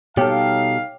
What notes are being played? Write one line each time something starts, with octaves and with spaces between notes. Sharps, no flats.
B2 G3 D#4 G4 A4 C#5 F5 G5